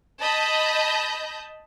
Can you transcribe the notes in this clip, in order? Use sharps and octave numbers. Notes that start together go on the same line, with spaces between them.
D#5 A5 B5 G6 A#6